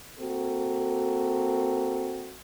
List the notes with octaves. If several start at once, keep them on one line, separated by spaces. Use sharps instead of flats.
A#3 C4 F#4 A4